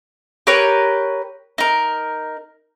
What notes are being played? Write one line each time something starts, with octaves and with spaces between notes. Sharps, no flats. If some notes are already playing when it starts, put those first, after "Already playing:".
G4 A#4 B4 C#5
D#4 A#4